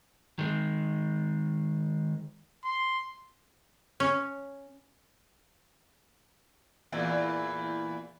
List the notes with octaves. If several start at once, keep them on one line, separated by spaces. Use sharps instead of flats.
D#3 G#3
C6
C#4
E2 A#2 E3